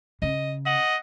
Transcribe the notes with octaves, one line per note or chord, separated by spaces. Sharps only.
C#3 D#5
D#5 F#5